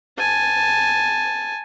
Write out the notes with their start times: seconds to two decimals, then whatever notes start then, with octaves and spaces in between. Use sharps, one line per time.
0.19 G#5 A5